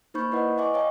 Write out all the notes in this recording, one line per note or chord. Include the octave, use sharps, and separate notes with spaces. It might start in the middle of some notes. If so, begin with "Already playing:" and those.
A#3 D#4 C5 B5 C#6 G6
E4 B4 D5 D#5 F#5
D#5 E5 G#5 C#6 D6
C#5 D#5 F5 G5 A5